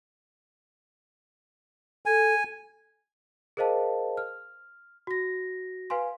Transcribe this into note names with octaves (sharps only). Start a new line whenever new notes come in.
A4 G#5
G#4 A#4 C5 D#5 F5 A5
F6
F#4 A#6
B4 F5 G#5 C6